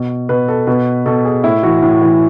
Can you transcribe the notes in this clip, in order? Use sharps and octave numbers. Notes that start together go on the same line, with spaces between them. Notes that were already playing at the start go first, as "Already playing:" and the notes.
Already playing: B2
B2 B4
A4
B2 B4
B2 A4
G#4
A2 E4
E3 F#4
A2
E3